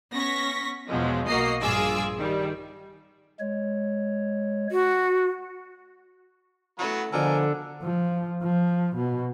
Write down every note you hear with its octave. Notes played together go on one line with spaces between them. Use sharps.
B3 C#4 C#6 A#6 B6
E2 B2 F3 F#3 G#3
B1 A#3 F#4 D#5 A#5 C7
A#1 G2 F4 G#4 D6 E6
D#3 G3
G#3 C#5
F#4
F#3 A3 B3 C#4 E4 F#4
B2 D3 F3 D4 A4 A#4 D5 G#5
F3
F3
B2